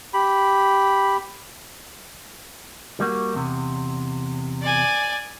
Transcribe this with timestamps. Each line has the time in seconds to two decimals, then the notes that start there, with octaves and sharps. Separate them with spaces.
0.13 G4 B5
3.00 G3 A#3 F#4
3.34 E2 C3
4.61 D5 G#5